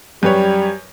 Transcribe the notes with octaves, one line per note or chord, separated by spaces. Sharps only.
F#2 G3 B4 C#5